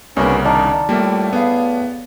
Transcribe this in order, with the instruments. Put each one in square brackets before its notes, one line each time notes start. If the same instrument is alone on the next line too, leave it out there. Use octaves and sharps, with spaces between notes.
[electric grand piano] C2 C#3 [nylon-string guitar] A#3 F#4 A#4 [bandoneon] B3 C#4 D4
[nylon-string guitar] D#3 [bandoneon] D4 D#4 [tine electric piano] D5 A5
[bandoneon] A2 [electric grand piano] G3 A3 [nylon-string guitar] A#3 F4 G4
[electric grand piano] B3 [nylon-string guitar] G#4 F5